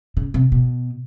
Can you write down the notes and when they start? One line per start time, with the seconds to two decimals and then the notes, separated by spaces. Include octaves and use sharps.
0.17 C#3
0.34 C3
0.52 B2